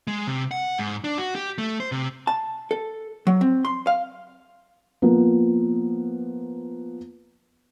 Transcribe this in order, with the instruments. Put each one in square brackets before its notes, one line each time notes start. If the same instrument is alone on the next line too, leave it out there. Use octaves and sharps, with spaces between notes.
[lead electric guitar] G#3
C3
F#5
G#2
D4
F#4
G4
A3
C5
C3
[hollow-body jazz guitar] A5
A4
F#3
C4
C6
F5
[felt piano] F3 A#3 B3